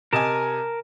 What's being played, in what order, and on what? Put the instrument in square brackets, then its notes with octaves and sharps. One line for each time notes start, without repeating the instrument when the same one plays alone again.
[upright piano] C3 D#5 G#5 [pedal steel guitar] A#4 A5